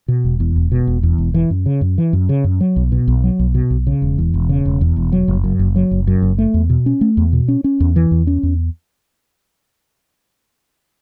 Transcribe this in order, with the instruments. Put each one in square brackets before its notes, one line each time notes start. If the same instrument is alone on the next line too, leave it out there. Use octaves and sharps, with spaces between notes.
[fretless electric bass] B2
E1
E2
E1
B2
E1
E2
E1
E3
F#2
C#3
F#2
E3
F#2
C#3
F#2
F#3
B1
B2
B1
F#3
B1
B2
B1
C#3
E1
E2
E1
C#3
E1
E2
E1
F#3
F#1
F#2
F#1
F#3
F#1
F#2
F#1
A3
E2
B2
C#4
A3
E2
B2
C#4
C#4
E2
E3
E2
C#4
E2